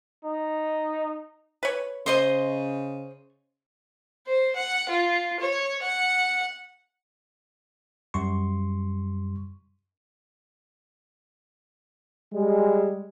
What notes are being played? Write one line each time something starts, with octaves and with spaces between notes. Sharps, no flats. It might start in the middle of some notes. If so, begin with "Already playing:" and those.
D#4
B4 C#5
C#3 C5 D#5 C6
C5
F#5
F4
C#5
F#5
F#2 G3 C6 C#6
G3 G#3